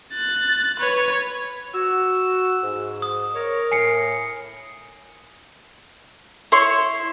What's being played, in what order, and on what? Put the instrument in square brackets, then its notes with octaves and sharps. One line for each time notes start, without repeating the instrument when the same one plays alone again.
[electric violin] F#6 A6
B4 C#5
[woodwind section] F#4 [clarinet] E6
[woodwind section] G#2
[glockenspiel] D#6
[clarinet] A#4 [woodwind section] C#5
[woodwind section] A2 [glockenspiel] G#5 C7 C#7
[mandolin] E4 C#5 C6